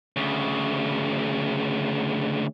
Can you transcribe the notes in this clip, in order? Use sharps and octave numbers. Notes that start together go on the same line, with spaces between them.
D2 C#3